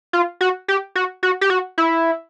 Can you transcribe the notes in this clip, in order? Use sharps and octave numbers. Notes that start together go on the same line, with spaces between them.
F4
F#4
G4
F#4
F#4
G4
F#4
E4